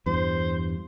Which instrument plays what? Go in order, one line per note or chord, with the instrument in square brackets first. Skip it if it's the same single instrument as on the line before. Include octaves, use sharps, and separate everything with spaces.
[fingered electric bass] E2 G2 [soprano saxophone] C5